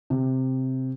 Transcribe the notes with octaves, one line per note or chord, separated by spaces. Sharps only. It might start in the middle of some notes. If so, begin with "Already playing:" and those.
C3